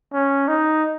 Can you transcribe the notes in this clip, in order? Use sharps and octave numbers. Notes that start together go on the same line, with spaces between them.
C#4
D#4